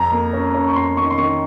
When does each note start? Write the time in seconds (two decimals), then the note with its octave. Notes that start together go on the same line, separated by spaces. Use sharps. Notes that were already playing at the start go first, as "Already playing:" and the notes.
Already playing: F2 A#5
0.12 A#3
0.33 C#4
0.54 C#4
0.69 C#6
0.76 F2 C6
0.97 D#3 C#6
1.10 C6
1.18 D#3 C#6